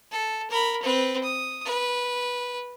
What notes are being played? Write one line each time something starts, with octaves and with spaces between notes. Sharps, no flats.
A4
A#4 B5
C4 B4
D#6
B4